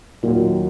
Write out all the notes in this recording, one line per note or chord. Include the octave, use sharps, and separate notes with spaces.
D#2 A#2 D#3 F#3 D#4